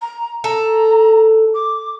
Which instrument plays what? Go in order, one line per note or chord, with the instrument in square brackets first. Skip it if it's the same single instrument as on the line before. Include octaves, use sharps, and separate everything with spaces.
[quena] A#5
[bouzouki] A4 [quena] A#5
[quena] D6